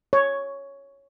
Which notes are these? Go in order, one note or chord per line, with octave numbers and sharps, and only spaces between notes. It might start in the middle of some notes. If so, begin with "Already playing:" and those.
C#5